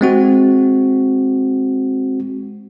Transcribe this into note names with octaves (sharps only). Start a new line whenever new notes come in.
G#3 C4 F#4